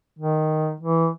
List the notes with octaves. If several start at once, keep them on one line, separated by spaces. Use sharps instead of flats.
D#3
E3